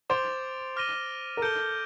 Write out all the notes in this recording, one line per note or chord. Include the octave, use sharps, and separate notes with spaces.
C5 D6 A6 D7 F7
D6 F6 A#6 D#7 G7
A#4
A4 G6 D7 G7